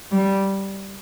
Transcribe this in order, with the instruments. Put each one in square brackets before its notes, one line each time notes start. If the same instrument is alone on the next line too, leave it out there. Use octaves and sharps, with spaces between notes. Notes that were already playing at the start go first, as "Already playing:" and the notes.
[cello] G3